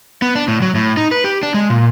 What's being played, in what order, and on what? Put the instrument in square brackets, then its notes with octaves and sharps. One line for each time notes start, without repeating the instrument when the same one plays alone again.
[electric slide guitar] B3
D4
A2
F#3
A2
D#4
B4
G4
D4
G#3
A#2